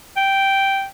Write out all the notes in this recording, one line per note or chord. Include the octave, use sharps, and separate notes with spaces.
G5